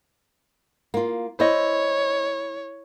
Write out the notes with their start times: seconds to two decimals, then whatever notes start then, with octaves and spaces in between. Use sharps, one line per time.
0.94 A#3 F4
1.40 E4 C5 C#5 D#5